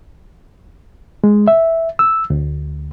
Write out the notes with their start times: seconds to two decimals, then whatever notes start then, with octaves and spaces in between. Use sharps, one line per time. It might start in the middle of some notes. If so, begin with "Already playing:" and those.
1.24 G#3
1.48 E5
1.99 E6
2.30 D2